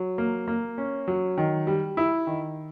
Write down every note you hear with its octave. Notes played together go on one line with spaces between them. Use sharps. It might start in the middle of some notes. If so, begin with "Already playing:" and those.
Already playing: F#3
A#3
A#3
C#4
F#3
D#3
G3
E4
D#3